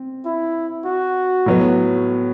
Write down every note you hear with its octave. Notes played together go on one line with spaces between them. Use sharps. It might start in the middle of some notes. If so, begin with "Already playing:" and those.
Already playing: C4
E4
F#4
A2 F#3 B3